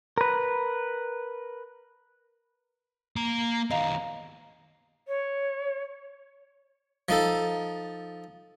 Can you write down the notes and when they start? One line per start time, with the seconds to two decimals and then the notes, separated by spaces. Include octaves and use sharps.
0.18 A#4 B4
3.16 A#3 A#5
3.71 D#3 B3 D#5 F5 A#5
5.08 C#5
7.09 F3 D#4 A4